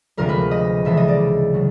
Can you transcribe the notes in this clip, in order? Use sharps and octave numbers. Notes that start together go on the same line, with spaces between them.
D2 C3 F3 G#3 A#4
B4
D#5
C#2 C3 E3 G#3 E5
D#5
D5
C#3 F#3